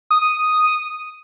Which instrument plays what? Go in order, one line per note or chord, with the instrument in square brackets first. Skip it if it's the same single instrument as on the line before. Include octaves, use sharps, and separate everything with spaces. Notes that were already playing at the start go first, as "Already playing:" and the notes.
[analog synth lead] D#6